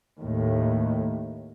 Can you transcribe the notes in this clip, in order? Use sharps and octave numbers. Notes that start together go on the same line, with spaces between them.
D#2 A2